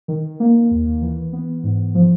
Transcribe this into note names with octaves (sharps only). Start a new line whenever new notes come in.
D#3
A#3
D#2
E3
B3
G#2
F3